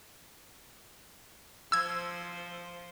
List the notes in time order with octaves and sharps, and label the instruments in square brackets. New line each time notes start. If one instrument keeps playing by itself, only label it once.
[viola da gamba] F3 C5 [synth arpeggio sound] E6 G#6